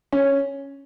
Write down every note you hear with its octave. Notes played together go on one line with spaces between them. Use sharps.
C#4